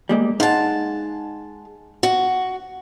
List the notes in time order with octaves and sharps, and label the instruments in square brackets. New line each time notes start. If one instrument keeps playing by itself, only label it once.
[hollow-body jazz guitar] G3 G#3 A#3
[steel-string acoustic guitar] G#3 A5 [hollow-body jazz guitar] D#4 F5 F#5
[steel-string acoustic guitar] F#4